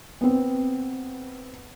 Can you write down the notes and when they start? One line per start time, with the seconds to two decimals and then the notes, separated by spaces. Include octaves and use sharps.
0.21 B3 C4